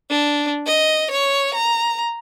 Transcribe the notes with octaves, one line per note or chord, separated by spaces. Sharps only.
D4
D#5
C#5
A#5